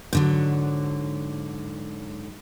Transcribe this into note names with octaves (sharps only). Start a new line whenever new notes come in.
G#2 D3 F#3